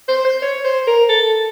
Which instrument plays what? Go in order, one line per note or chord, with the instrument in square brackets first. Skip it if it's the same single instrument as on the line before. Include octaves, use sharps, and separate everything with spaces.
[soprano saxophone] C5
C5
C#5
C5
A#4
A4